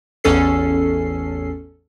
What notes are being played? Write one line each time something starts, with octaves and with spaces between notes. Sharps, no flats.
A1 E2 C#4 A4 C7